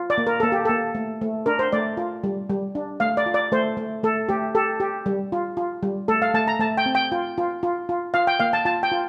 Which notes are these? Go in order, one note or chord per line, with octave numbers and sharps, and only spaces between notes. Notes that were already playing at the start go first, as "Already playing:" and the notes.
Already playing: F4
D5
A#3
A#4
A#3 A4
G4
A#3 A4
A3
A3
D4 A#4
C5
A3 D5
F4
G3
G3
D4
A3 F5
D5
F4
D5
A3 C5
A3
A3 A4
A3 G4
G4 A4
G4
G3
F4
F4
G3
A3 A4
F5
A3 A5
A#5
A3 A5
G5
C4
G5
F4
F4
F4
F4
F4 F5
G5
A#3 F5
A5
F4 A5
G5
F4